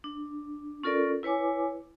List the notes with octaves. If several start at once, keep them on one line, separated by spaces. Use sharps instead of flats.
D4
C#4 F4 A4 A#4 D5
E4 B4 C#5 G#5 D6